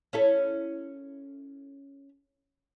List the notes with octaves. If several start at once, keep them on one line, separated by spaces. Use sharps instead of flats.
C#4 E4 A4